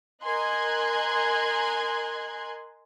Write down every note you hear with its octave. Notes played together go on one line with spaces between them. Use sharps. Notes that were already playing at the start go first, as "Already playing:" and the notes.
A#4 D#5 G#5 C6 F#6 G#6